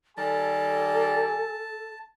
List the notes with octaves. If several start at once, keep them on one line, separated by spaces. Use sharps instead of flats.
D#3 G3 A4 G#5 A5